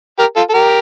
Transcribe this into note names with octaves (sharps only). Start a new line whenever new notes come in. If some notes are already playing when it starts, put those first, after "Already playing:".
G4 A#4
F4 A4
A4
G4 A#4